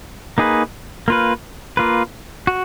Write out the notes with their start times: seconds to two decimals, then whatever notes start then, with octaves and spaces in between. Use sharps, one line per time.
0.38 A#3 D#4 G#4 B4
1.08 A#3 F4 B4
1.77 A#3 F4 B4
2.47 F#4